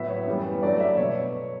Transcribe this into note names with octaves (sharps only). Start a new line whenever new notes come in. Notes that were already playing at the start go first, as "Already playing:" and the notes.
Already playing: A2 F#3 B3 E5
C#5
F#2 E3 G3 B3
G2 F#3 A3 D5
E5
B2 C#5